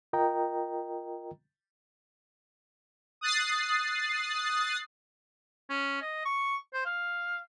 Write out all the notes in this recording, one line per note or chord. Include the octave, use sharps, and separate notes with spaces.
F4 A#4 D#5 G5 A#5
D#6 F#6 A6 C7
C#4
D#5
C#6
C5
F5